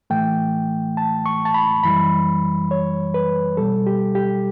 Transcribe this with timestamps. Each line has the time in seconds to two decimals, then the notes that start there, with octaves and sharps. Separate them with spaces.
0.10 A2 E3 A3 G5
0.97 A5
1.26 C#6
1.45 A5
1.54 B5
1.83 F#2 E3 G3 B5
2.71 C#5
3.14 B4
3.57 B2 G3 A4
3.87 G4
4.15 G4